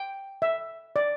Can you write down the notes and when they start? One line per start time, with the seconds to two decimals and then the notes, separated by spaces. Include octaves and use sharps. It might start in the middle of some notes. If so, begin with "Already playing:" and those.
Already playing: G5
0.42 E5
0.96 D5